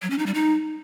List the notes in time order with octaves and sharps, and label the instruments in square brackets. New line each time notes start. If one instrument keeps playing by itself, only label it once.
[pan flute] F#3
C#4
D#4
G3
D#4